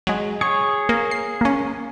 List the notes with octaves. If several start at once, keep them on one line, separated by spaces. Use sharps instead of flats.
F#3 G#3
G#4 C#5 C#6
A#3
C7
A#3 C#4